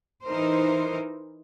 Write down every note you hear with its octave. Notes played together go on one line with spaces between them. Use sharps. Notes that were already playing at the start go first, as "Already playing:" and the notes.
E3 D#4 A#4 C5